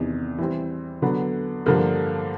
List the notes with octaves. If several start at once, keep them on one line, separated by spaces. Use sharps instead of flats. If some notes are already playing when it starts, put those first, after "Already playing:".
Already playing: E2 C3 D#3
E3 G3 C4
D3 F#3 B3
G2 D3 F3 A#3